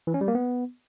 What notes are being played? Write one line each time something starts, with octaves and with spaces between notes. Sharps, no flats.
E3
C#4
G3
A#3
B3